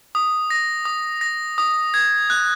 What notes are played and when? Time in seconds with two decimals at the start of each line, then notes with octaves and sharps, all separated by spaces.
0.15 D#6
0.50 A#6
0.85 D#6
1.21 A#6
1.58 D#6
1.94 G#6
2.30 F#6